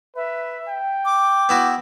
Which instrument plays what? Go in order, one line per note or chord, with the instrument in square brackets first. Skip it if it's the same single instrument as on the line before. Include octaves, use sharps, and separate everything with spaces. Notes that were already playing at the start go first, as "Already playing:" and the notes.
[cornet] B4 [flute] E5
[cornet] G5
[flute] D6
[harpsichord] B3 E4 F#4